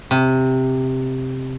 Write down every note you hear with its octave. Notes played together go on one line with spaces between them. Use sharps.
C3